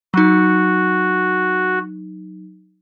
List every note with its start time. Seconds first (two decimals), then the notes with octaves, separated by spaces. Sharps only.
0.14 F#3 D#4 F#4